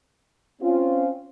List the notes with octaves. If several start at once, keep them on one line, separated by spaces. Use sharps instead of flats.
C4 C#4 F4